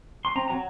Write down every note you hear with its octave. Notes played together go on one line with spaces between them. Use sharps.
C6
C4 A#5
F#3 A#5